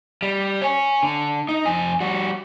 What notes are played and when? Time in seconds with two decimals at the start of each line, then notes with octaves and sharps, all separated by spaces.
0.22 G3
0.62 C#5 G#5
1.03 D3
1.49 D#4
1.66 F2 G#5
2.01 G3 F#4